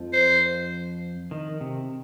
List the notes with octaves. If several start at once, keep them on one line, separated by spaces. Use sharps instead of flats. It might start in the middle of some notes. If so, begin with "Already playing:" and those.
Already playing: F2 F3
C5
D#3
C3